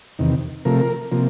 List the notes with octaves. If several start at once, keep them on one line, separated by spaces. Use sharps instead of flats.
E2 C3 D#3
C3 F3 A3 A#4
C3 F3 A#3